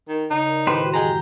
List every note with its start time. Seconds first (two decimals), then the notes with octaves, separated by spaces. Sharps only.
0.08 D#3
0.31 C#3 D#4
0.46 A#4 D5
0.67 A2 D#3 E4 G4 B4 C5
0.82 G#3 F#4
0.94 F#2 E3 F#3 G#3 G4 A#5